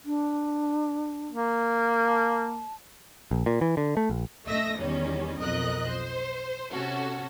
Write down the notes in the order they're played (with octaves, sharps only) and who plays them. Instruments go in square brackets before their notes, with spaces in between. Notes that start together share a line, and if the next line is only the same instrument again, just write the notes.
[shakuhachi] D4
[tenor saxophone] A#3
[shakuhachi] A5
[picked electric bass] A#1
A#2
E3
D3
A3
A#1
[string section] A3 D#5 E5 E6 A#6
E2 D#3 G3 C#4
B1 F2 A#4 D#5 F#6
C5
C3 C#4 F#4 A4